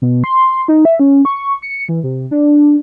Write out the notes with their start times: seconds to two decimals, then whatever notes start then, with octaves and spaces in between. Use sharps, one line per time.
0.02 B2
0.24 C6
0.68 D#4
0.85 E5
1.00 C#4
1.25 C#6
1.62 C#7
1.89 E3
2.04 C3
2.31 D4